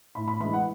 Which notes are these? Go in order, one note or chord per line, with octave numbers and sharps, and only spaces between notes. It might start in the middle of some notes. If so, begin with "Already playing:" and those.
A2 B5
B5
E3 G#3 B5
F#5